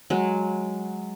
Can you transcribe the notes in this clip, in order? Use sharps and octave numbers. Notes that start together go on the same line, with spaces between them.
F#3 G#3